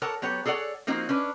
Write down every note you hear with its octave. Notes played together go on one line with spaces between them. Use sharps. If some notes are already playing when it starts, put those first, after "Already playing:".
A4 A#4 C#5 F#5 A5
F#3 B3 G4 C#5
G#4 A4 C#5 D5 F#5
F3 A#3 C4 D#4 F#4
C#4 D4 B4